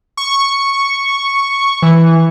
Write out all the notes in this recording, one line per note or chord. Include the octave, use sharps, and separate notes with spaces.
C#6
E3